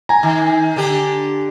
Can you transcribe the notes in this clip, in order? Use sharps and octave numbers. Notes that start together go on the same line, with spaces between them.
G#5 A#5
D#3
D3 D4 G4